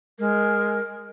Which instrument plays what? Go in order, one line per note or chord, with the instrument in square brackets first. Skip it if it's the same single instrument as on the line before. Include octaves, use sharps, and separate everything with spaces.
[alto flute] G#3 [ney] A#4